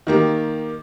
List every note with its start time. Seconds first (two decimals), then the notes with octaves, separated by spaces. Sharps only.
0.07 D#3 A#3 G4